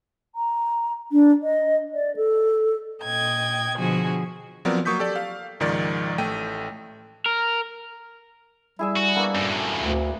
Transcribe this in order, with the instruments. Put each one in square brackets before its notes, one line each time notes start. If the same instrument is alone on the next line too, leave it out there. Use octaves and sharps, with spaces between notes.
[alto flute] A#5
D4
D#5
D5
A4
[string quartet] A#2 D#5 G5 G#6
B2 D3 F3 F#4 G#4 G#5
[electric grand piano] F3 F#3 B3 C4 A#4 D5
F#3 A#3 C#6 D#6 G6 B6
G4 A4 D5
F5
C#2 G#2 D#3 F3 D5 A6
A1 A3 G5 D#7
[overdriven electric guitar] A#4
[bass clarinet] G3 [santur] E4 G#4 E5
[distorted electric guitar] F#4
[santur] A#3 B3 D4
[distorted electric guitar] F#2 A2
[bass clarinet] D2